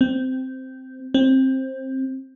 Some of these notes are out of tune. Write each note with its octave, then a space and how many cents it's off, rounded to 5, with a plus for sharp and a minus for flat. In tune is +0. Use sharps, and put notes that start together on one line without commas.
C4 -10
C4 +15